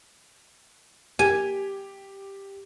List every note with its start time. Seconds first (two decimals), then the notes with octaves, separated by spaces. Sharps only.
1.19 G4 G#5